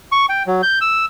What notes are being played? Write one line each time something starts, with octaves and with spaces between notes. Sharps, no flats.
C#6
G5
F#3
G6
E6